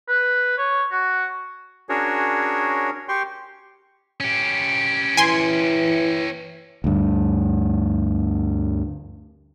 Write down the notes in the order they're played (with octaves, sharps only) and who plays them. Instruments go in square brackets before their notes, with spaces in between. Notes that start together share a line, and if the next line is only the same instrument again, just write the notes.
[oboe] B4
C#5
F#4
[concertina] C#4 D4 F#4 G#4 A#4 C#5
G4 G5 C6 C#6
[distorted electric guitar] C#4 G4
[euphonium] E3 [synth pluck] G#5 C6
[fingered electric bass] D2 G2